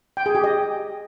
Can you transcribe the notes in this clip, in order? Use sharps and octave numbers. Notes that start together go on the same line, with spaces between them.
G5
G#4
G4
D#5